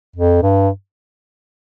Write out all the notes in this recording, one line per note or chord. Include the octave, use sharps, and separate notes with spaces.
F2
G2